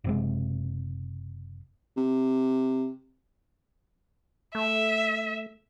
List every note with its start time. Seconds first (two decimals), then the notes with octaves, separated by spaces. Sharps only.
0.04 F#1 C3 G#3
1.97 C3
4.55 A3 E5